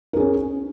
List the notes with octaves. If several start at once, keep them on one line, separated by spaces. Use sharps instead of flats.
C#4 G#4 A#4